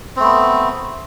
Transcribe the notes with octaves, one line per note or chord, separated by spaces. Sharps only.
A3 B3 C4